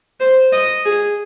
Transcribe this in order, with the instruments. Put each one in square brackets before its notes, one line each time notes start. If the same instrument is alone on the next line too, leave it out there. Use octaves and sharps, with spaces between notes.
[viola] C5
D#5
G#4